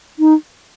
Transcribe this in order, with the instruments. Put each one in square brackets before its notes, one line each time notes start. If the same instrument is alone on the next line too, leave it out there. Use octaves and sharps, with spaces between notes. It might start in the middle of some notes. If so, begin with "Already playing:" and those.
[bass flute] D#4